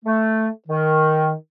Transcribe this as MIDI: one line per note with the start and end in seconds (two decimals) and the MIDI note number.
0.05 0.48 57
0.68 1.33 51